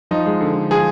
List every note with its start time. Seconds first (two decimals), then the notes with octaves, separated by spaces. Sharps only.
0.11 F3 D#4
0.26 G#3
0.41 D3
0.55 D3
0.70 F3 G#4